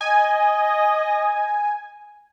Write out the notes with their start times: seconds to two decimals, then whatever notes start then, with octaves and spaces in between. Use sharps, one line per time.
0.01 D#5 G#5